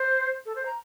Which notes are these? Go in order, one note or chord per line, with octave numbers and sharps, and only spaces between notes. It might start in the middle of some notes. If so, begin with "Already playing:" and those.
Already playing: C5
A4
C5
A#5